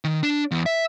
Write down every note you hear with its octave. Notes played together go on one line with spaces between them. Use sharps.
D#3
D4
E2
E5